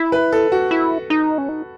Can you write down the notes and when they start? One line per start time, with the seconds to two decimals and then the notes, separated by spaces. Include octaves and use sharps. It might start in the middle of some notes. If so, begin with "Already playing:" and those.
Already playing: E4
0.12 B4
0.32 A4
0.52 F#4
0.71 E4
1.10 D#4
1.38 C#4
1.49 D#4